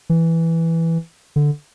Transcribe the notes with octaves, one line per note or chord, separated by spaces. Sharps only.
E3
D3